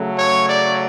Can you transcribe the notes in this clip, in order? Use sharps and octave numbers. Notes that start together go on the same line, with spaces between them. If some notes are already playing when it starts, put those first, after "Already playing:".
Already playing: C#3 F#3 A3
C#5
D5